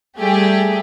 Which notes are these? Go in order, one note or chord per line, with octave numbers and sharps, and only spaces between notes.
G3 A3 G4 G#4